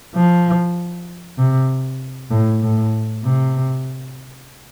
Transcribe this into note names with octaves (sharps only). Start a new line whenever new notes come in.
F3
C3
A2
A2
C3